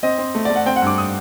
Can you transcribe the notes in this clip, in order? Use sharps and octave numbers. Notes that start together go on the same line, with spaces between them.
C4 D#5
C4
A3
D5
A3
F#5
C4 G5
F#5
G2 D6
D#6